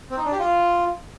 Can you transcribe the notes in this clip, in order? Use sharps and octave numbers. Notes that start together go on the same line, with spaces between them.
C4
D#4
D4
G4
F4